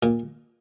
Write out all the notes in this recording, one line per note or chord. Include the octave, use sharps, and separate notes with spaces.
A#2